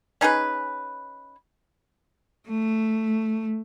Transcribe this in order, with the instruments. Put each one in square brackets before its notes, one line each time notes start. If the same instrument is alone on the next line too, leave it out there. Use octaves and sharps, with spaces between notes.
[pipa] C#4 D#4 G#4 B4
[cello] A3